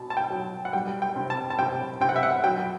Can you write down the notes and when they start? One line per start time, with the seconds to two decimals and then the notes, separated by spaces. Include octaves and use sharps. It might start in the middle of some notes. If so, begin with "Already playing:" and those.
Already playing: B2 A5
0.10 A5
0.17 G5
0.30 F#3
0.65 F#5
0.73 G3 G5
1.02 G5
1.16 C3
1.30 A5
1.50 A5
1.59 C3 G5
2.01 C3 G5
2.09 F#5
2.16 E5
2.23 F#5
2.44 F#3 G5